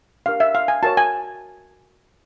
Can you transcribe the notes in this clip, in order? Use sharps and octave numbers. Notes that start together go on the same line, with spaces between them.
D4 G4 A#4 F5
E5
F5
G#5
F#4 A#4 C#5 A5
G#5